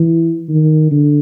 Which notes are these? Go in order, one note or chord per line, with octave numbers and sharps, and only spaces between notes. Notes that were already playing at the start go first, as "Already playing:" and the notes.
Already playing: E3
D#3
D3